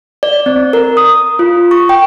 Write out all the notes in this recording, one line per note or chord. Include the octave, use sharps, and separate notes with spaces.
D5
C4
A#4
D#6
F4
C#6
G5